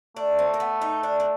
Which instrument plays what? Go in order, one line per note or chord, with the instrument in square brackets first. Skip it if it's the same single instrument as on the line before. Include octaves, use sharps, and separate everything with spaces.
[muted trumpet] A3 [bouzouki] D4
[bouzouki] C4
A#3
B3
D#4
D4
D4